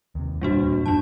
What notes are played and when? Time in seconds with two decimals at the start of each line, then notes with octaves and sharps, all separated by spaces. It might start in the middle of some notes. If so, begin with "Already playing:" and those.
0.15 D#2 C3
0.41 E1 G2 A#2 G3 D4 F#4
0.86 F2 F3 D4 A5